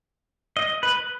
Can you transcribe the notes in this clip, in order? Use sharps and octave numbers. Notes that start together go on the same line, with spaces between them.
D#5
B4